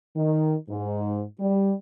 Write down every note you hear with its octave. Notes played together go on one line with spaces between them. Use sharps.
D#3
G#2
G3